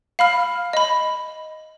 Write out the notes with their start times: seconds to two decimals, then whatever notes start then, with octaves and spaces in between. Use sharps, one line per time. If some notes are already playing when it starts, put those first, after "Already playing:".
0.19 F5 B5 F6
0.73 D#5 B5